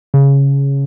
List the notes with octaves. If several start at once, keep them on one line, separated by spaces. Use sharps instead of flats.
C#3